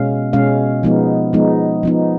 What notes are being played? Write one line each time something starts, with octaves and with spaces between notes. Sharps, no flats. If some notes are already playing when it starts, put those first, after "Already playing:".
Already playing: B2 G#3 C#4 F5
B2 G#3 C#4 F5
F3 G#3 B3 D#4
F3 G#3 B3 D#4
F3 B3 D#4